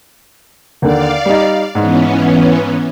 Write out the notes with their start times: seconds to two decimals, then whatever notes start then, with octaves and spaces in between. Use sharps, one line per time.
0.82 D#2 D3 D5 F5
1.25 G3 D#4
1.75 G#2 E3 B3 C#4